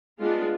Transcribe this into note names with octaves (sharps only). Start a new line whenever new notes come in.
G#3 B3 D4 F4